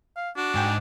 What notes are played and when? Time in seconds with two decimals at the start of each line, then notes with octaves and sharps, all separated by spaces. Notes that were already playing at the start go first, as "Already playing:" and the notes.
0.17 F5
0.37 D4 F#4
0.55 G#2 G5 G#5